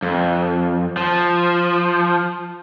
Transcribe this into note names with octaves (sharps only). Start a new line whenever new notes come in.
F2
F3